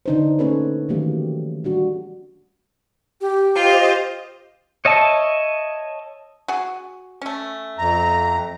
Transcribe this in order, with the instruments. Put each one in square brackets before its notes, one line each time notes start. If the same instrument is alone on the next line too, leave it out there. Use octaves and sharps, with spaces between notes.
[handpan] D3 D4 D#4 B4 C5
A3 A#3 C#4 A4 B4 C#5
D#3 E3 F#3 A3 A#3 G4
G3 D4 F#4
[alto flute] G4
[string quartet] F4 [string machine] C5 D#5
[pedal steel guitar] C#5 D#5 E5 A5
[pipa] F#4 G#4
A3 C#4
[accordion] F2 A#5